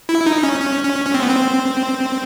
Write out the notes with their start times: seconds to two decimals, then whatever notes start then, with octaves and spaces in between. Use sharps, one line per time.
0.09 E4
0.26 D#4
0.43 C#4
0.61 C#4
0.84 C#4
1.06 C#4
1.14 C4
1.22 B3
1.30 C4